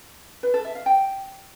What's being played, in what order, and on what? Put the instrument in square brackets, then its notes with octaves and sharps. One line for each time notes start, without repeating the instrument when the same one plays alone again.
[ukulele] B4
A4
E5
F5
G5